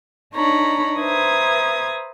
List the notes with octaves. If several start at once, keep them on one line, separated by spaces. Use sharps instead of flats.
D4 D#4 C#5 A#5 B5
B4 C5 E5 A#5 D#6 G#6